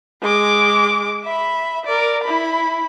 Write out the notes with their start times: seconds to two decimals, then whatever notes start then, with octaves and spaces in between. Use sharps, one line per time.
0.22 G#3 D6
1.24 E5 B5
1.85 A#4 D5
2.23 E4 B5